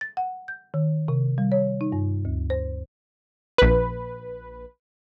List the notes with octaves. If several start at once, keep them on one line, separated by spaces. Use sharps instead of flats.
A6
F#5
G6
D#3
C3
G3
C#5
D#4
G2
D2
C5
A#1 B4